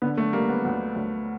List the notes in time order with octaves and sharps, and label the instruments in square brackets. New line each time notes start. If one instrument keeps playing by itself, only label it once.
[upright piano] D3 B3
A3
G3 A#3
B3
D2
D2